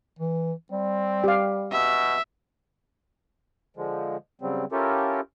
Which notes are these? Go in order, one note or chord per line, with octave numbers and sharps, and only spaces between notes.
E3
G3 C4
G4 F5
B2 E5
D3 F3 G#3
C#3 F#3 G3 C4
C#4 E4 F4 G4 A4 A#4